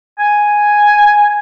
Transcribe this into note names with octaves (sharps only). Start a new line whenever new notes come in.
G#5